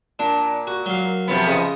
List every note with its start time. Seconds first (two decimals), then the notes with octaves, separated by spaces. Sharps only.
0.19 A#2 D4
0.67 F#4
0.86 F#3 F5
1.28 C3 F3 B3
1.47 C#3 D#5